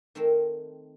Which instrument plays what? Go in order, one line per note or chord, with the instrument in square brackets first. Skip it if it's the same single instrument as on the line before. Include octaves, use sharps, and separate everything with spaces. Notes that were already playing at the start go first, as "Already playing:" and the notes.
[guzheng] D#3 A3 C4 A#4 C5